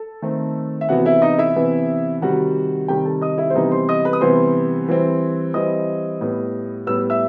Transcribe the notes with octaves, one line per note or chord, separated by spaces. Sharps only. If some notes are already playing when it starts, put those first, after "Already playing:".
Already playing: A4 A5
D#3 A3 C4
E5
C3 E3 B3 F#4 F#5
E4 E5
D#4 D#5
E4 E5
C3 E3 B3
C3 D#3 G3 F#4 F#5
C3 D#3 G3 G4 G5
A4 A5
D#5 D#6
E4 E5
C5
C3 E3 G3 B3 D#4 D#5
C5 C6
D#5 D#6
B4 B5
D#6
C3 E3 G3 B3 C5 C6
E3 G3 C4
E3 G3 C4 D#5 D#6
A2 G3 B3
A2 G3 B3 E6
E5 E6